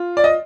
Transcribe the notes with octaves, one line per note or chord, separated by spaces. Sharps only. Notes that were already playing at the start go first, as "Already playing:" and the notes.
Already playing: F4
D5
D#5